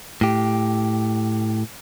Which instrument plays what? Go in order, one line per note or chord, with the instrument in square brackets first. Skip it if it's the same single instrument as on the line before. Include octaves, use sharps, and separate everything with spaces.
[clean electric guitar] A2 G4